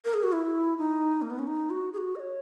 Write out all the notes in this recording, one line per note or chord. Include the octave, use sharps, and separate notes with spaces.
A#4
G#4
F#4
E4
D#4
A#3
B3
C#4
D#4
F#4
G#4
F#4
D#5
C#5